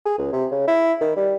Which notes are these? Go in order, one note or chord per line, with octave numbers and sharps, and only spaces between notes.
G#4
C#2
C3
C#3
E4
D#3
G3